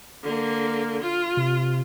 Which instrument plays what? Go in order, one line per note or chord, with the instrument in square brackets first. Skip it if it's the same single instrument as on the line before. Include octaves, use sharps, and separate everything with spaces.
[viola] D3 A#3
F4
[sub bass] C3